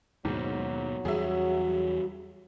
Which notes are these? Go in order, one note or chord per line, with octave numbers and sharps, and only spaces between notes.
D#2 G#2 B2 F#3
E2 G3 F#4 G#4 E5